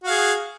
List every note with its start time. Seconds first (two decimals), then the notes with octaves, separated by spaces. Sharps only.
0.04 F#4
0.07 F5
0.10 G#4